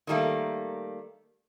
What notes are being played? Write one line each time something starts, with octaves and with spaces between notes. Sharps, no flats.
D#3 F#3 G3 A3 A#3